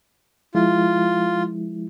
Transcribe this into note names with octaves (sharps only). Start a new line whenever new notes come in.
F3 G#3 E4 F4